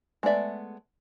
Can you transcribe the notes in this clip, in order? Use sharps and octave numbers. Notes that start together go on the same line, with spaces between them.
G#3 A3 B3 D5 E5